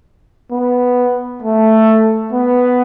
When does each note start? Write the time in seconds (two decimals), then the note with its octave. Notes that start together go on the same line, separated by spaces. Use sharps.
0.51 B3
1.42 A3
2.33 B3